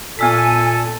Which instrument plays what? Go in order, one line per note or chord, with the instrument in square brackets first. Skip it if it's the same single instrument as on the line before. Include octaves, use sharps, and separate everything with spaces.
[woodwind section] A#2 [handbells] B3 E6 B6 [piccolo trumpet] A4 [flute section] G#5